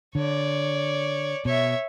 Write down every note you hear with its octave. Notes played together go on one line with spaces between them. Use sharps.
D3 C#5 D5
B2 C#5 E5